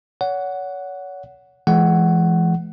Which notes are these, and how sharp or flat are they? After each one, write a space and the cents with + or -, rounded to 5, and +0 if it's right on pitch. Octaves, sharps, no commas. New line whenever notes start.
C#5 +35 F#5 +0
E3 +40 G#3 +35 F#5 +15